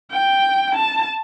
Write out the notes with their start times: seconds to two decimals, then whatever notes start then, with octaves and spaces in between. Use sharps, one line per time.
0.11 G5
0.75 A5